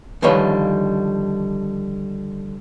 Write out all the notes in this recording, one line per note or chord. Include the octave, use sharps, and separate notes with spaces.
D3 D#3 F3 G3 B4 C#5